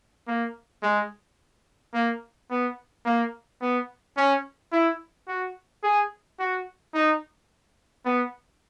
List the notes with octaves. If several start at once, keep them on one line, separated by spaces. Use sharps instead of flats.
A#3
G#3
A#3
B3
A#3
B3
C#4
E4
F#4
G#4
F#4
D#4
B3